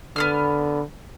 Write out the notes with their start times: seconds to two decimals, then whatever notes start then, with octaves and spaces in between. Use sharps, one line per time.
0.16 D3 B3 G#4 F6